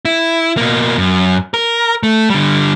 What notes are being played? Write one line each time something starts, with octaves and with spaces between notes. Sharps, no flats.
E4
B2 A#3
F#2
A#4
A3
D3 G3